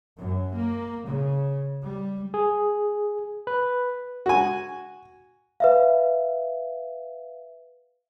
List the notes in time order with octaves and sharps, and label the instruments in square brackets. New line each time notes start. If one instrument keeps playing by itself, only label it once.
[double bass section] F#2
A#3
C#3
G3
[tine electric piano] G#4
B4
[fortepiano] F#4 G#5
[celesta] B4 E5 F5